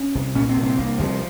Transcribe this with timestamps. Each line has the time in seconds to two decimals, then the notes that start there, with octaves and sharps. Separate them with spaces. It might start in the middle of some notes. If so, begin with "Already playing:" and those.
Already playing: C#4
0.15 C2
0.35 A#2 C#4
0.49 C4
0.56 C2
0.63 C4
0.78 C2 A#3
0.98 C2 F3